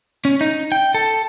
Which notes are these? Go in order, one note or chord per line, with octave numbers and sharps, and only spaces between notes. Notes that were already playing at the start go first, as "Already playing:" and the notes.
C#4
D#4
G5
A4